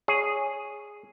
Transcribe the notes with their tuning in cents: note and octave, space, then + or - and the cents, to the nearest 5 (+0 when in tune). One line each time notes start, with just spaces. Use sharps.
G#4 +0 C#5 +0